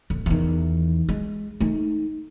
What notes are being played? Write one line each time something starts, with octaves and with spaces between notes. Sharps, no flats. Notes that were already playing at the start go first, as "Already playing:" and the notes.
D1
E2 D#3
G#3
A3 D#4